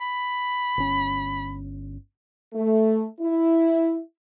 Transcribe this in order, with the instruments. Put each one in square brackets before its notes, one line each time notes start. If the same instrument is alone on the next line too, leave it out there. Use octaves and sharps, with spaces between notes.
[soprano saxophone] B5
[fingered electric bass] G1 C#4
[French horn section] A3
E4